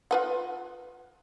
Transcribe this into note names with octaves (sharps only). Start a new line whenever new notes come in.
F4 B4 F#5